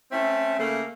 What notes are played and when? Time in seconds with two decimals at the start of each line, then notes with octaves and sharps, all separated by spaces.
0.12 A3 C4 C#4 E5
0.59 C#3 A3 A#3